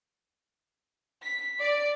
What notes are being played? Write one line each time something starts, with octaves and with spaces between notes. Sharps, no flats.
B6
D5